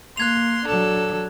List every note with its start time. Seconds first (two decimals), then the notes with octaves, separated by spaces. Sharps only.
0.17 A#3 C6 F#6 G#6 F7
0.67 F#3 D4 A4